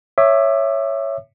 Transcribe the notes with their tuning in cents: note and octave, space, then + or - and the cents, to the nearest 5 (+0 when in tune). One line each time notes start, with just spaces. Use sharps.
C#5 +0 E5 +5 D6 +40